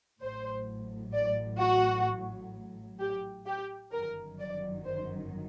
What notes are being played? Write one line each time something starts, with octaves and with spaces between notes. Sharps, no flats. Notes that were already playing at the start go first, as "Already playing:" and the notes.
A1 A2 F#3 C5
D5
F#4
G4
G4
G1 F#2 D#3 F#3 A#4
D5
C5